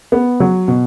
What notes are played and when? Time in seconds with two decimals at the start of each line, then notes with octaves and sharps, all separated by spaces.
0.12 B3
0.40 F#3
0.68 B2